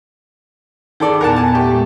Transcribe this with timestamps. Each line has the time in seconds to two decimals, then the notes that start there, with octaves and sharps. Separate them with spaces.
1.00 D#3 G#4 A4 D5
1.21 E2 A#2 B3 A#4 F#5 A5
1.36 G#5 A5
1.53 A3 G4
1.71 A#2 G#3